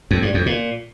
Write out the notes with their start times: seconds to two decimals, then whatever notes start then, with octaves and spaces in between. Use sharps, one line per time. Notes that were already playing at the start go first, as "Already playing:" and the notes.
0.11 F2
0.22 G2
0.34 F2
0.46 A#2